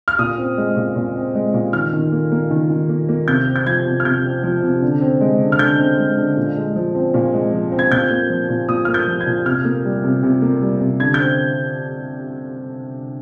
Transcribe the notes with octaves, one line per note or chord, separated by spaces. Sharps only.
F6
A#2 D#6
C4
G#3
A#2
A#2
C4
G#3
A#2
D#3 F6
D#3
A#3
A#3
D#3
D#3
A#3
A#3
C3 G6
C4
G6
F3 G#6
C3
F6
C3 G6
C4
F3
C3
D3
C4
G#3
D3
F6
D3 G6
C4
G#3
D3
A#2
G#3
F3
C4
A#2
G#3
F3
C4
G#6
A#2 G6
A#3
F3
A#2
A#2 D#6
A#3 F6
G6
F3
G#6
A#2
C3 F6
A#3
G3
C3
C3
A#3
G3
C3
D3 G#6
G6
C4